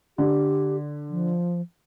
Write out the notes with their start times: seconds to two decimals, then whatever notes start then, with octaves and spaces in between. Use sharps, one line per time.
0.18 D3 G4
1.10 F3